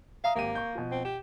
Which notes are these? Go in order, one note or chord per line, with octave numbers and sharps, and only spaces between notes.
E5 F5 A#5 D#6
G#1 A#3 G4 D#7
C#6 G6
B2 F3
C4
G4 E7